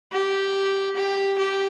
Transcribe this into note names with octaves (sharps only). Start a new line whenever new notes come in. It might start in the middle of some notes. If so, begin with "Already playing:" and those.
G4
G4
G4